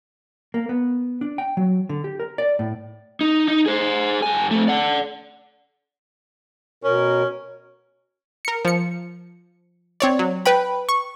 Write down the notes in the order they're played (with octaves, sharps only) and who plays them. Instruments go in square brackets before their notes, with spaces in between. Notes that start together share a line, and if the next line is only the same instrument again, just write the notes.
[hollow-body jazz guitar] A#3
B3
D4
G5
F#3
D3
G4
A#4
D5
A2
[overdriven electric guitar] D#4
D#4
G#4 C5
G2 G#5
A3 C4
D5 F#5
[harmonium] B2 A#4 [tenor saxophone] C#4
[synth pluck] A#4 C#7
F3 C#7
C4 C#5 D5
F#3
B4 G5 B5
C#6